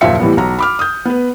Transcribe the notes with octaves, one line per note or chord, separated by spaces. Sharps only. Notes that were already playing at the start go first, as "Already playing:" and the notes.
F#1 D#2 A#2 F3 E5 C#7
A2 E3 G3 B3
B1 A#5
B5 D6 F6
D#6 G6
B3 B4